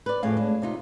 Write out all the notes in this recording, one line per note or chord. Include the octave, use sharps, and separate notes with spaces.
B4 D5
F2 A2 G#4 D5 F5
G#3 D4
C3 D#4 F4